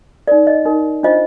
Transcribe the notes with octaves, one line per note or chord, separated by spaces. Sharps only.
D#4 A#4 D5
D#5
D#4 A#4
D4 F4 C5 D#5